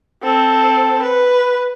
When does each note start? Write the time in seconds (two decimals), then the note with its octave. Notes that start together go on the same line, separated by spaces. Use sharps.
0.23 C4 A4
1.03 B4